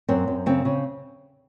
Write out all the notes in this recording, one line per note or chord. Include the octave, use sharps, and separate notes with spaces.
F#2 C4
F#2
C#3 C4
C#3